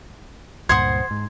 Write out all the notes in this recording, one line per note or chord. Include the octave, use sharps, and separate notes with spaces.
C#2 G2 A#2 C5 F#5 C6 D#6 G#6
G#2